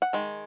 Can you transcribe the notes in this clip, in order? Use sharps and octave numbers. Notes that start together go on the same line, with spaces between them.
F#5
D#3 G#3